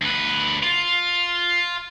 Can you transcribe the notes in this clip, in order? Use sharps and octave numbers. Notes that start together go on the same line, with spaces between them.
D2 B4
F4